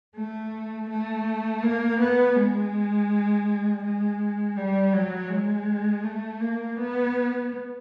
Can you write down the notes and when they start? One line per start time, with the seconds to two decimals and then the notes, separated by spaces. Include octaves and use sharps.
0.16 A3
0.90 A3
1.63 A#3
2.00 B3
2.36 G#3
3.83 G#3
4.57 G3
4.93 F#3
5.30 G#3
6.04 A3
6.40 A#3
6.77 B3